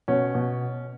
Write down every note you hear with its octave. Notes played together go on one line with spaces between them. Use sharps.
B2 C#4
B2